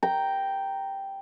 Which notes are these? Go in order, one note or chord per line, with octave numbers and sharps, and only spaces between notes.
G5 A#5